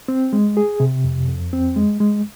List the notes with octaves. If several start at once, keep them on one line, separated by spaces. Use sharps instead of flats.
C4
G#3
G#4
C3
F2
F2
C4
G#3
G#3